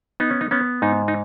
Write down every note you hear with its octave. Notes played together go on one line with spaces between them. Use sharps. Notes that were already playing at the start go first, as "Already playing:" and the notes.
B3 D#4
C#4
D#4
B3 C#4
G#2 D#4
D#4